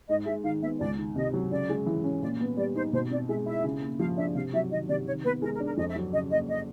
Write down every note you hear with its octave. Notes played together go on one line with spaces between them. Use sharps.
G#2 D#5
G#3 E5
D#3 F5
B3 E5
C#2 D5
D#3
C3 D#5
F#3
C#3 D5
G#3
E3
C#4
A#2 D5
B3
G3 D5
D#4 C5
B2 C5
C4 D5
G#3 E5
E4 E5
C#3
A#3
F3 F5
D4 E5
C3 F5
F#3 E5
D#3 D#5
C3 D5
D#3 C#5
B3 B4
G#3 A#4
A#4
D4
A#4
F2 D#5
E5
F#3
C#3 D#5
A#3 D#5
D#5